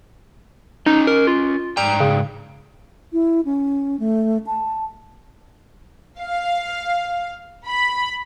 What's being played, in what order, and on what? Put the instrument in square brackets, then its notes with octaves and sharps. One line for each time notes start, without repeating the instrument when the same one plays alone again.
[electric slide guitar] C#4 D#5 [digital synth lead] D#4
[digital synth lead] A#4
F4
[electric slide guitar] G#2 D5 G5 [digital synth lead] A#5
[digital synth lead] C#3
[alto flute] E4
C#4
A3
A5
[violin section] F5
B5